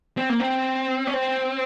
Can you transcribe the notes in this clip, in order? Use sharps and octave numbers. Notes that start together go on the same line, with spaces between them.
C4
A#3
C4
C#4
C4